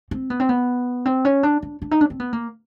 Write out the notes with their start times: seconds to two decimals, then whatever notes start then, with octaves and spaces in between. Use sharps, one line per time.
0.11 C4
0.30 B3
0.40 C4
0.49 B3
1.06 C4
1.25 C#4
1.43 D4
1.62 D4
1.82 D4
1.91 D#4
2.01 D4
2.10 C4
2.20 B3
2.33 A#3